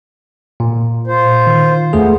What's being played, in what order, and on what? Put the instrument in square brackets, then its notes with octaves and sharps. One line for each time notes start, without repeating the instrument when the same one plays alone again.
[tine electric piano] A#2
[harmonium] F4 C5
[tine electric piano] D#3
[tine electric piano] E2 A3 G#4 [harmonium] B3